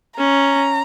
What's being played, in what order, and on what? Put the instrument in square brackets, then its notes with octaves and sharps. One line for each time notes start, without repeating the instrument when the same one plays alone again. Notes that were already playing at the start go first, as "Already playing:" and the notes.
[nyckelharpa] C#4 [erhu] A#5